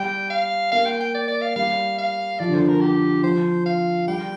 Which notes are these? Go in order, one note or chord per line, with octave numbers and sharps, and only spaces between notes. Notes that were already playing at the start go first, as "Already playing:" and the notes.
Already playing: G3 G5
F5
A#3 F5
G5
G5
D5
D5
F5
G3 F5
F5
F3 D5
D3
F3 C5
A#4
G4
F3 C5
F5
G3 G5